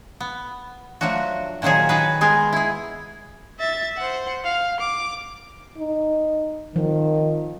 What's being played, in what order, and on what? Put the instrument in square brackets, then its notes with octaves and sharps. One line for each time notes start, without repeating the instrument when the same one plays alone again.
[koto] B3
F3 F#3 A3 D4 F#4
A#2 D#3 F3 F#3 G#4
D#3 F#4 G#4 B4
G#3 B3 G#4 A#4
E4 G#4
[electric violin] E5 A6
C5 F#5
F5
D6
[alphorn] D#4
[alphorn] D#3 [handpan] F3